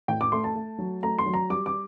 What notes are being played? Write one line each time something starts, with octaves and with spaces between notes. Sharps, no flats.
A2 G5
D6
A3 C6
A5
A3
F#3
A3 A#5
C6
F#3
A#5
G3 D6
D6